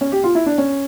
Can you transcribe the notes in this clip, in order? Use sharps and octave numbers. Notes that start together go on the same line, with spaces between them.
C#4
G4
F4
E4
D4
C#4